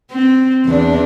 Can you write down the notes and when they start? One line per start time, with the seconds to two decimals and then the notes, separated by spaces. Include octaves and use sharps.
0.11 C4
0.66 E2 D4